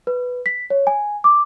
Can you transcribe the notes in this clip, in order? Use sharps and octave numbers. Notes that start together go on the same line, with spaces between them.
B4
B6
C#5
G#5
D6